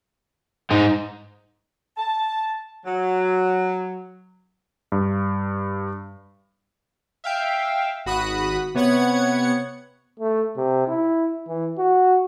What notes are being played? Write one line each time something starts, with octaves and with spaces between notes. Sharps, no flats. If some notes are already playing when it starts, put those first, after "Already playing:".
G#2 G#3 D#4
A5
F#3
G2
E5 F5 G5
G#1 F#4 B5 D#6 F#6
C3 B3 C#5 F#5 G#6 C#7
A3
C3
E4
E3
F#4